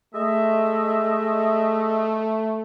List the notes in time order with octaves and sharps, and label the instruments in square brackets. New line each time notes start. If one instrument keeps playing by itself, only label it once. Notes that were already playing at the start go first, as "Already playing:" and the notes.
[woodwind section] G#3 D#5 E5 [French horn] A3